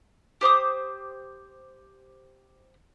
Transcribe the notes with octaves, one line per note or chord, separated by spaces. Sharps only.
G4 C5 D6 D#6